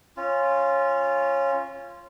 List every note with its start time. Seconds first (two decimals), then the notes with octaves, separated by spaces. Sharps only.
0.17 C#4 F4